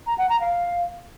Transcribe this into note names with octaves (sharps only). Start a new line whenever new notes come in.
A#5
F#5
A#5
F5